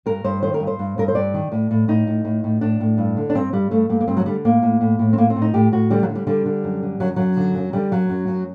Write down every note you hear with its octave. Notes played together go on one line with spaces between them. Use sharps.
G2 A#4
G2 C5
D#3 C5
A#4
G2
C5
G2
G2 A#4
C5
G2 D5
D#3
A2
A2
A2 D#4
A2
A2
A2
A2 D4
A2
G2
D3
D4
G2 C4
G2 G3
G2 A3
G2 A#3
A#3
G2 C4
F#3
D3 G3
A2 A#3
A2
A2
A2
C4
A2 A#3
C4
A2
D#4
A2 G4
A2 F#4
D3 G3
F#3
D3
G3
D3 G3
D3
F#2
D3
F#2 F#3
F#2 F#3
D3
F#2
D3 G3
F#2 F#3
F#2
F#2